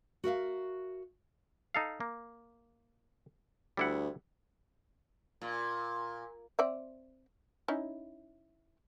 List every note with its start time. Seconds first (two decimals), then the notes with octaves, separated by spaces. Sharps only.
0.24 F#4 A#4 E5 F5
1.75 D#4 A4 F5
2.00 A#3
3.77 D2 G3 E4 F#5
5.42 A#2
6.59 C4 D5 E5
7.68 C#4 D#4 E4